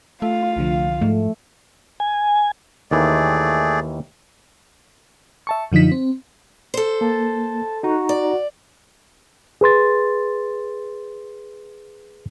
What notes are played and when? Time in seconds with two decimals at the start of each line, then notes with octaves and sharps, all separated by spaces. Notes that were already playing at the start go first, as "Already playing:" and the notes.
0.22 A3 F4 F5
0.56 C2 D3 F3
1.02 G#2 F3 A3
2.00 G#5
2.91 D#2 D#3 E3 A3 G#4 D5
5.47 E5 A5 C#6
5.72 F#2 D3 F3 D#4 B6
5.92 C4
6.74 A4 C5
7.01 A#3 A5
7.83 D#4 F#4 A#5
8.09 D5
9.61 G#4 B4 C6 A6